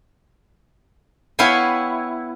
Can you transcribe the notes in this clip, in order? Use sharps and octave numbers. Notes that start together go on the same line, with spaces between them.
B3 E4 C#5 F5 G5 G#5